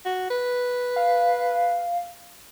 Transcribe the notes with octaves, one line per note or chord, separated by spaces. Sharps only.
F#4
B4
F5